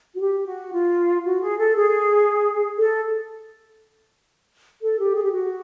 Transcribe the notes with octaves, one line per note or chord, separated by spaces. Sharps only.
F#4
G4
F#4
F4
F#4
G#4
A4
G#4
A4
A4
G4
G#4
G4
F#4